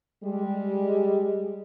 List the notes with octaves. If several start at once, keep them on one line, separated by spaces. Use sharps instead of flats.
G3 G#3 G4